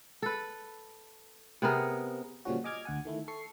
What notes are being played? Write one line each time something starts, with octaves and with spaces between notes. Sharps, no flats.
A4 B4
C3 B3 G#4 A#4
A#2 C#3 F3 G3 C#4 F#4
D#5 G#5 D6 F6 G#6
D2 F#5 G#5
D#3 A3 E4
A4 C#6 C7